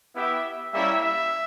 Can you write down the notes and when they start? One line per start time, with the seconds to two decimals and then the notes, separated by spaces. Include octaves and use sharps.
0.15 B3 E4 G4 E5
0.73 G3 A#3 C#4 E4 E5
1.02 E5